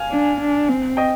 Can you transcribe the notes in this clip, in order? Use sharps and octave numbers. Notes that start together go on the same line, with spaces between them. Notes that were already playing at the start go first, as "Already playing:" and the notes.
Already playing: F5 G#5
D4
D4
C4
D#5 G5